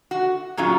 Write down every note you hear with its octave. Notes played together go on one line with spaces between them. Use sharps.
F#4
A#2 F#3 C#4 F4 G#4